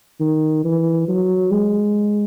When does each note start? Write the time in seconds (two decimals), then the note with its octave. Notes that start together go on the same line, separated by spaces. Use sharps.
0.20 D#3
0.64 E3
1.08 F#3
1.51 G#3